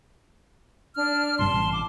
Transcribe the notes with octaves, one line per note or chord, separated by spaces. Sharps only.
D4 F6
G1 C2 G2 A5 C6
A1
D6